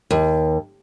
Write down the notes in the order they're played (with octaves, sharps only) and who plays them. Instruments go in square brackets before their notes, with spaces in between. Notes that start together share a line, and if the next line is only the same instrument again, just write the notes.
[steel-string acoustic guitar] D#2